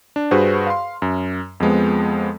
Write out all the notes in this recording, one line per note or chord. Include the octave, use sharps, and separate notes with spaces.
D4
G2 F#4 G#4 B4 C5
F5 C6
F#2
F2 F3 G#3 B3